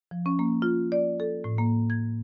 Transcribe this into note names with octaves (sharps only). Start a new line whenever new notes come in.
F3
C#4
A#3
F4
D5
A4
A2
A#3
G#6